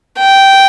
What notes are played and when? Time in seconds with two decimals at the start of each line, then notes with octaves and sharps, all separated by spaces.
0.19 G5